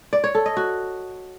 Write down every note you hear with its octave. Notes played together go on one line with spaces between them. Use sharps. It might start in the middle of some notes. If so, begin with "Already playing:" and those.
D5
C#5
A4
D#5
F#4